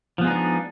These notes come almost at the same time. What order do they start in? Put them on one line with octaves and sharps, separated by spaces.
F3 B3 G#3 D#4 D4